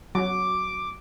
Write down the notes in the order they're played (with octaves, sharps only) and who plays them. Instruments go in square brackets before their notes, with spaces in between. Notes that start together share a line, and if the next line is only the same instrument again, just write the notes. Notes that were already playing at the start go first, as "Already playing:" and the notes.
[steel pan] F#3 F#4 [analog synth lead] D6